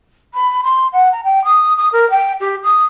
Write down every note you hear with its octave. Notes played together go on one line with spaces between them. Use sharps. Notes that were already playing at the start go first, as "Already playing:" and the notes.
B5
C6
F#5
A#5
G5
D#6
D#6
A#4
G5
G4
D#6